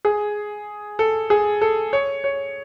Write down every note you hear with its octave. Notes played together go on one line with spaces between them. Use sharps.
G#4
A4
G#4
A4
C#5
C#5